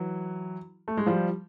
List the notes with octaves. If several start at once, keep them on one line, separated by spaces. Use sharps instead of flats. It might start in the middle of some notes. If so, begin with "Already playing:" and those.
Already playing: E3 F#3
A3
G#3
F3 G3